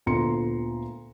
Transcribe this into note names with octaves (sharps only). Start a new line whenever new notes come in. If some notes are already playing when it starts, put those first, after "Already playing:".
D2 A#2 B3 A#5 C6 C#7